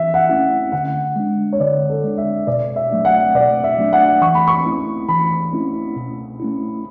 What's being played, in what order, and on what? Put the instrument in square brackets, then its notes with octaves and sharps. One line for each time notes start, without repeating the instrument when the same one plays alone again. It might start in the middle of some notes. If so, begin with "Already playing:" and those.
Already playing: [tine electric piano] E3 [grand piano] E5
[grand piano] F#5
[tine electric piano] A3 C#4 E4
[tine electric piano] D3 [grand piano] F#5
[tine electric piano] G#3 D4
[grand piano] C#5
[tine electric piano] D3 [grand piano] D5
[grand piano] A4
[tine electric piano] G#3 D4
[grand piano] E5
[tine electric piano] B2 [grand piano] D5
[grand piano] E5
[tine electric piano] F#3 A3 D4
[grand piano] F#5
[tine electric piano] B2 [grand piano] D5
[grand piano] E5
[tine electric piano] F#3 A3 D4
[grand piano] F#5
[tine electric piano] E3 [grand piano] C#6
[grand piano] B5
C#6
[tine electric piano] A3 C#4 E4
[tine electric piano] E3 [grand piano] B5
[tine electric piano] A3 C#4 E4
B2
A3 C#4 E4